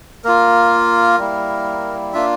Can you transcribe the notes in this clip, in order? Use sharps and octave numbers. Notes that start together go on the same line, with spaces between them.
A#3 F4 A#4
G3 A#3 E4
A#3 D4 F4 E5